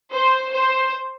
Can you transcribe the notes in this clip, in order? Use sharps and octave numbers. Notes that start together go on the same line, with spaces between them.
C5
C5